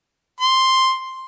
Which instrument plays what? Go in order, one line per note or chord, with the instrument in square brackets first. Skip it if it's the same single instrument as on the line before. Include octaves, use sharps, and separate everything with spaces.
[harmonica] C6